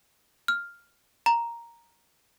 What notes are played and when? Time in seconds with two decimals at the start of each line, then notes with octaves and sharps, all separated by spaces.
0.48 F6
1.26 A#5